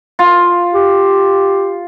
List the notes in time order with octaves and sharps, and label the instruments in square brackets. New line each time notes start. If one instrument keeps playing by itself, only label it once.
[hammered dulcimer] F4
[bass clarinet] G4